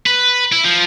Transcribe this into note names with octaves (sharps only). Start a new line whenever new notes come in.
B4
E4
F3